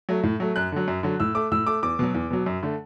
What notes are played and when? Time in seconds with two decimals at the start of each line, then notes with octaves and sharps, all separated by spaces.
0.09 F#3 A3
0.23 A2
0.40 F#3 A3
0.56 F#2 F#6
0.72 D3 F#3
0.88 F#2
1.03 D3 F#3
1.20 A2 E6
1.35 A3 D6
1.52 A2 E6
1.67 A3 D6
1.83 E2 D6
1.99 B2 F#3
2.14 E2
2.31 B2 F#3
2.46 F#2
2.63 D3 A3